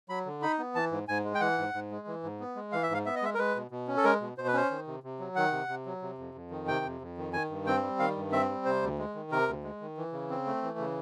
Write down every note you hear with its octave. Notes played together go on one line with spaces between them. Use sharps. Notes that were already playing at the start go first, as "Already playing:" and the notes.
F#3 B5
D3
D#4 B5
B3
E3 A5
G#2
G#2 G#5
G#3
G5
E3 F#5
G#2
G#2
G#3
E3
G#2
B3
G#3
E3 F5
E5
G#2 F5
B3 E5
D#5
G#3 E5
A#4
G#3 B4
B2
B2
C#4
A4
G#3 A#4
B2
B2 C5
B4
C#4 C5
D#3
C3
C3
F#3
D#3 F#5
C3
C3
F#3
C3
F2
F2
D#3
C3 G5
F2
F2
D#3
D#3 G#5
G2
C4 G5
G3
D#3 F5
G2
C4 E5
G3
C3 C5
D2
G#3
D#3
C3 A#4
D2
G#3
D#3
E3
C#3
C4
A3
E3
C#3